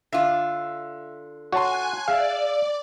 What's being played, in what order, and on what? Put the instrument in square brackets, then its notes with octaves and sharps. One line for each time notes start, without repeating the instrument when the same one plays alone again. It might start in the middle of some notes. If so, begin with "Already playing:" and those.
[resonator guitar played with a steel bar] D3 F4 [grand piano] E5
[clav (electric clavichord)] F#4 [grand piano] C#5 A5 C6 [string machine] G#5 F#6
[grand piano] G#4 E5 [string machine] D5 [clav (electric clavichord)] F5